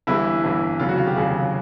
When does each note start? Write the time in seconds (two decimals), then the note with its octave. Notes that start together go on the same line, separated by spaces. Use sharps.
0.07 G1 G2 E3 G3 E4
0.44 G1 G2 E3 G3
0.79 F1 D#2 C#3 F#3 F4
0.89 F#4
0.98 F4
1.07 G4
1.16 F1 D#2 C#3 F#3 G#4